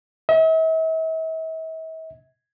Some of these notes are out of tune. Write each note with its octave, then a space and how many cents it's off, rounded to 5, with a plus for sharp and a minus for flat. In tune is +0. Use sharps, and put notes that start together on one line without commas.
E5 -45